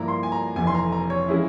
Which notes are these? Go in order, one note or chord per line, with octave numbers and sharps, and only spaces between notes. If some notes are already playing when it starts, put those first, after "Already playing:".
Already playing: G2 F3 A#3 E4 A#5
C6
G#5
A#5
F1 F2 E3 G#5
C6
A#5
A#5
C#5
F3 G#3 C#4 E4